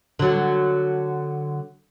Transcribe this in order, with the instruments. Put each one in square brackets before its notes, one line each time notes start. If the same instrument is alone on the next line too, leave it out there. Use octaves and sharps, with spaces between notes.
[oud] D3 F#3